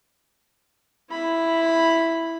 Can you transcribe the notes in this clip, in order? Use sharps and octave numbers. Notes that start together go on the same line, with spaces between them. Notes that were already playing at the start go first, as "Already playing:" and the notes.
E4 B5